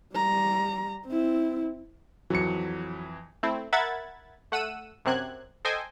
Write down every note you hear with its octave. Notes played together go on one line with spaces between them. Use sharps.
G3 A#5
C4 E4
F2 E3 F#3 C#7
A3 C4 E4
A#4 E5 F#5 B5 G#6 A6
A3 F#5 E6 D#7
F#2 C3 C4 F#6 G#6
A4 C5 D#5 G5 G#5